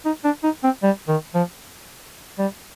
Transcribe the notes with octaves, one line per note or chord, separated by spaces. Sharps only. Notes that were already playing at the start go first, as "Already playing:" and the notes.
D#4
D4
D#4
C4
G3
D#3
F3
G3